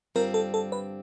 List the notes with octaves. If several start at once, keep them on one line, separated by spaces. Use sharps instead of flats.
G2 D3 G3 C4 F4 A#4
A4
A4
B4